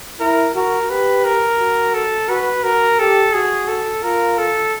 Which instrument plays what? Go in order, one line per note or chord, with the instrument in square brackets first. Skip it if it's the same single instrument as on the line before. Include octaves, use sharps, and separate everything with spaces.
[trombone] E4 [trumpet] A#4
[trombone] F#4 [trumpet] A#4
[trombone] G4 [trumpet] B4
[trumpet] A#4
[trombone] F#4
[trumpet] A4
[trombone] F#4 [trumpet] B4
[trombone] F#4 [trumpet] A#4
[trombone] G4 [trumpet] A4
[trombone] F#4 [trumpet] G#4
[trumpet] A4
[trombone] F4 [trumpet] A#4
[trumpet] A4